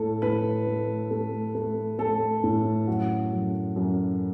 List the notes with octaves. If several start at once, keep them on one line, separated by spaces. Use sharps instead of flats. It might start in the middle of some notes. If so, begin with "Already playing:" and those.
Already playing: A2 A3 A4
A2 B4
A3
A3
A3
A3 A4
A2
F#2 F#4
F#2
F#2